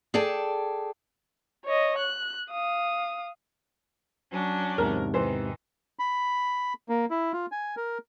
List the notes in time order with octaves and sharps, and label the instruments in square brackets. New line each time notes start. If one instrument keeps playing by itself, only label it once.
[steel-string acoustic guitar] G#4 A4 D5 G5 A5
[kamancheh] C#5 D#5
F#6
F5 D#6
[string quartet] F#3 C#4 D4
[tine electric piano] E2 G#2 C3 [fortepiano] A#4
[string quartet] D#3 [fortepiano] E3 C5
[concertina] B5
A#3
E4
F4
G#5
A#4